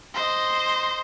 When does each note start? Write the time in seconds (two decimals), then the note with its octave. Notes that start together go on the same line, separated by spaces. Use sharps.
0.14 C5 D#5